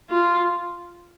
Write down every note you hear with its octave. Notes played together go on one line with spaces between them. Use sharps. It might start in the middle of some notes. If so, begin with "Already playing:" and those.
F4